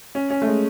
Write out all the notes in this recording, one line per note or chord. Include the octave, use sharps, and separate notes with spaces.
C#4
C#4
A3
G#3